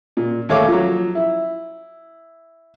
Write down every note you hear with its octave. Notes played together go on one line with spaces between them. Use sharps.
A#2
D#2 A3 C#5 F5 D6
F3 F#3
E4